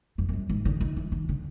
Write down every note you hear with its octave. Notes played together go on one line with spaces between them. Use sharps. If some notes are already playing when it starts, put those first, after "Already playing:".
F#2
F#2
G2
G#2
D3
D#3
E3
D#3
D3